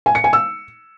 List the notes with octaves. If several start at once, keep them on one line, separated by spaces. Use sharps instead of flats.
G#5
C#7
G#5
E6